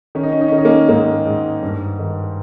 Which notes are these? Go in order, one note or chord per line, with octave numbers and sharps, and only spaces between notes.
D#3 C#4
D#4
C#4
D#4
C#4
D#3
D#4
A#3 C#4
G#2 A#3 C#4
G#2
G2
D#3